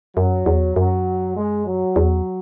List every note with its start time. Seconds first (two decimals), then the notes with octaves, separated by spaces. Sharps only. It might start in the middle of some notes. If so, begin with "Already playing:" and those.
0.16 F#2 F#3
0.46 E2
0.76 F#2 F#3
1.36 G#3
1.67 F#3
1.96 E2